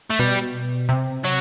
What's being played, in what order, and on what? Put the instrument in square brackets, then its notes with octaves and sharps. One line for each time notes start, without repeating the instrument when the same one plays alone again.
[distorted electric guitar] A3
[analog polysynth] B2 [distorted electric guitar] G3
[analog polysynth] C3
[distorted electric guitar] F#3